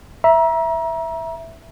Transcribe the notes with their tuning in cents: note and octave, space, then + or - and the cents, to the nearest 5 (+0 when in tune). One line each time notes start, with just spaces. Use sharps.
E5 +0 A#5 +30